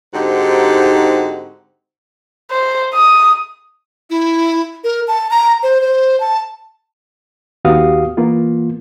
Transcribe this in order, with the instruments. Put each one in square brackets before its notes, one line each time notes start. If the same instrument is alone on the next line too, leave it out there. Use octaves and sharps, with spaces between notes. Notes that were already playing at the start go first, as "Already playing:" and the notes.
[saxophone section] G#2 D3 C4 D#4 F#4 G4
[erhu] C5
D#6
[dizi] E4
A#4
A5
A#5
C5
C5
A5
[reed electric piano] D#2 B3 F#4 G4 F5 D#6
E3 A#3 B3 F4